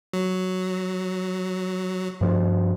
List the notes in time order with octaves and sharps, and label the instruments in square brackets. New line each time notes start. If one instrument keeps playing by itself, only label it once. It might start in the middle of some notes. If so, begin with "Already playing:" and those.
[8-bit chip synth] F#3
[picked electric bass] G2 F3